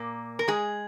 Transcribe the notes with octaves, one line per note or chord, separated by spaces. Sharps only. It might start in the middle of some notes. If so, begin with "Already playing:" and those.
Already playing: A#2 A#3
A#4
G#3 G#4